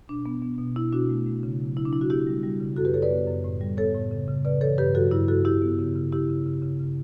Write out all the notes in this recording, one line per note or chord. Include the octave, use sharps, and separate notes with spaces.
B2 D4
B3
B3
B2
B2 E4
B2 D4 F#4
A3
A3
C#3
F#3
C#3 E4
D4
F#3 E4
D4 F#4
B3 E4 G4
G3
G3
C#3
F#2 F#4 A4
G4 B4
F#2 A4 C#5
B4 D5
B3
F#2
A2
G3
B3 A4 C#5
A2
C#3
C#3
C#3 B4 D5
E3 A4 C#5
G2 G4 B4
F#3 F#4 A4
G2 E4 G4
F#3 F#4 A4
C#3 E4 G4
B3
C#3
C#3
C#3 E4 G4
C#3
C#3
C#3
C#3